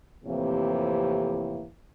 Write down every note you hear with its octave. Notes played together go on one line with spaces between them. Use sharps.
F2 A2 C3 E3 A#3 G4